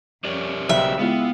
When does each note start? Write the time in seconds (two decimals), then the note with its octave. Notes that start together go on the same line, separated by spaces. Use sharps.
0.24 F2 C#4 G4 A#4 D5
0.69 B1 C#3 G3 C4 E5
0.99 G#3 B3 E4 F4 G4 F5